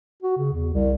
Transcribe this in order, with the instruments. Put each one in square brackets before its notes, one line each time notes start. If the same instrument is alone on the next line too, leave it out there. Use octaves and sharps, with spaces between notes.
[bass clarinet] F#4
C#3
E2
C2